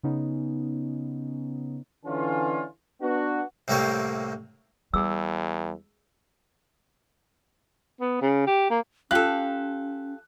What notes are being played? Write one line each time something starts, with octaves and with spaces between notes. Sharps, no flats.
C#3 B3 C#4 D#4
D3 E3 C#4 F4
B3 D4 F#4
C2 A2 G3 A#3 C4 C#5
E2 G3 G#4 E6
B3
C#3
G4
A#3
C#4 F4 G4 A4 F5 F#6